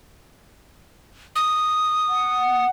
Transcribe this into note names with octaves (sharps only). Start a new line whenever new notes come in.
D#6
F#5